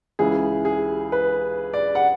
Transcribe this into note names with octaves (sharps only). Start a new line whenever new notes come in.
C#2 C#3 E3 G#4
G#4
B4
D5
F#5